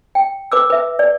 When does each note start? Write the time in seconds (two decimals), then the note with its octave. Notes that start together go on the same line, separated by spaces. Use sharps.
0.15 G5
0.52 B4 D6 E6
0.70 B4 E5
0.99 D5